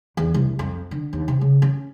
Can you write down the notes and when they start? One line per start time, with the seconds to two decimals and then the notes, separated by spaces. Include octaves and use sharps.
0.17 E2
0.34 C2
0.59 F2
0.91 D3
1.13 D#2
1.28 C3
1.41 C#3
1.62 C#4